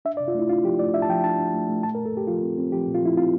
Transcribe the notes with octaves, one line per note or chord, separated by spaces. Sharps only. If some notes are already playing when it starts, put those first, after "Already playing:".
D4 E5
D5
C3
F4
A3 E4
D4 F4
F3 G4
A3 D5
D4 E5
A5
F3 G5
D4 A5
D4
A3
A3
A#2 A5
A#4
A#2
A4
A#2 G4
F3 F4
C4
C4
F3 G4
A#2
F4
F3 E4
C4 F4